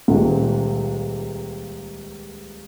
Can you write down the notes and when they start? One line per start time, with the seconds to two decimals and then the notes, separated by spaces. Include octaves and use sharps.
0.08 D#1 C#2